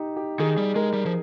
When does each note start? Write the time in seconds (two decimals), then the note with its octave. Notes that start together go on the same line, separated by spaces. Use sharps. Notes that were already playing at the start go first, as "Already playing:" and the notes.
Already playing: D#4 G4
0.16 G4
0.40 D#3 G#4
0.57 G3
0.75 G#3 A#4
0.93 G3
1.06 F3